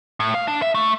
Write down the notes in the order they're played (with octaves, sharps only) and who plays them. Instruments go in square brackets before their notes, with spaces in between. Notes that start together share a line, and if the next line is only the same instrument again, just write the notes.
[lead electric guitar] A2
F5
D4
E5
A3